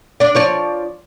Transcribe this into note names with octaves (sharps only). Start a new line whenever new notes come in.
D4 D5
F3 C#5 D5